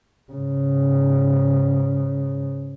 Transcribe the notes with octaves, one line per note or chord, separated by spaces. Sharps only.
G#2 C#3